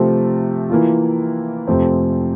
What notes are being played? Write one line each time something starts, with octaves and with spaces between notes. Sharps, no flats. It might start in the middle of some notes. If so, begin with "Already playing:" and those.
Already playing: C3 F3 A3 C4
E3 A#3 F4
F2 C3 F3 A3 C4